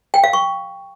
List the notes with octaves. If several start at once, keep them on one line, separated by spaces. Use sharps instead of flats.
G5
F5
C#6